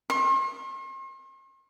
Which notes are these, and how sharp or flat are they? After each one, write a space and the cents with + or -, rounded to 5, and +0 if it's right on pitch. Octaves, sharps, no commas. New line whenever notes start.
C6 +45